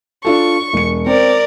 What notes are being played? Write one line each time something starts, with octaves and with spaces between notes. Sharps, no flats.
D4 F4 A4 C#6
E1 C#7
C4 A#4 D5